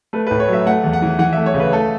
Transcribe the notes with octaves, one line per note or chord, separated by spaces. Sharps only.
A3 B4
B4
A2
C#5
F#3
E5
A3 F#5
E2
F#5
E3
E3 F#5
E5
A3
C#5
C#3
B4
A3 A4